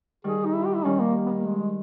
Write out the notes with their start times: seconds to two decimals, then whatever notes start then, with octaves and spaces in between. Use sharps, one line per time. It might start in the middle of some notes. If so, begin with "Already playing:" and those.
0.24 D#3 G3 G#4
0.45 D#4
0.55 E4
0.65 G4
0.75 E4
0.85 D#3 G3 C#4
1.00 A#3
1.26 B3
1.31 A#3
1.45 G#3